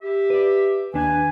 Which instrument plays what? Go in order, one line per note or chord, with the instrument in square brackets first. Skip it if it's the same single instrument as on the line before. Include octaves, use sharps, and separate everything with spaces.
[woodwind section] G4 E5
[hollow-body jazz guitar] B4 D5
[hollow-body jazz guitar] D#2 D4 [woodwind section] B4 G#5